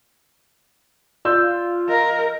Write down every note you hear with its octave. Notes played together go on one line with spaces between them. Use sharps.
F4 D5 E6 G6
A#4 D#5